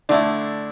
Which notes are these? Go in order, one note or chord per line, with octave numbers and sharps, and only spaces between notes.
D3 A3 D4 E4